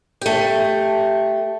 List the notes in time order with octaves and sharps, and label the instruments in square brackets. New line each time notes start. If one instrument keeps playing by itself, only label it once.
[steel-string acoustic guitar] A3 G4